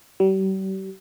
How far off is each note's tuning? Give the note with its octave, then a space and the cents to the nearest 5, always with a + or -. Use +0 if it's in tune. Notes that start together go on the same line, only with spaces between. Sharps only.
G3 -40